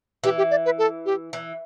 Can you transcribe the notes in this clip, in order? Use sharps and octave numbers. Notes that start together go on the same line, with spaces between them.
E3 G4
G4
D5
B4
A4
G4
E3